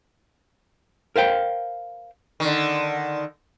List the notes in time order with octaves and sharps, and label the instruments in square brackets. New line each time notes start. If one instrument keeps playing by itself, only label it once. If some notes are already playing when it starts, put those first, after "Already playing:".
[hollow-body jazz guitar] A#4 C5 F5 G5
[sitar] D3 D#3